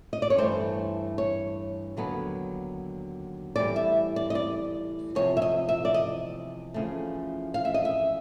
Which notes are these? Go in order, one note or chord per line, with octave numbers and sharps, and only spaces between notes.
D#5
D5
C#5
G2 E3 A3 C5
C#5
D#2 D3 F#3 B3
A2 E3 G3 B3 D5
E5
D5
D#5
D5
E2 C3 F3 C#5
E5
D#5
E5
D5
D#5
E2 C#3 F3 A3
F5
E5
D#5
E5